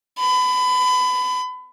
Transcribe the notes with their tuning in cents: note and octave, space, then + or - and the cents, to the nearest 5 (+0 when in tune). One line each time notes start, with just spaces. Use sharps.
B5 +30